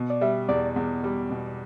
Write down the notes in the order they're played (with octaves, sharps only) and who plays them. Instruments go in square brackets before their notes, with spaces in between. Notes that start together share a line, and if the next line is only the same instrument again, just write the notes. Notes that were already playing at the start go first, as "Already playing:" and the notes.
Already playing: [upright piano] B2
[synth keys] D5
[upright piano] G3 [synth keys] E5
[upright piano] E2 [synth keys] D5
[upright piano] E2
G3
B2